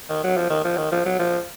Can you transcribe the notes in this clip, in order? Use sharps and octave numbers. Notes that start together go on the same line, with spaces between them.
D#3
F#3
F3
D#3
F3
D#3
F3
F#3
F3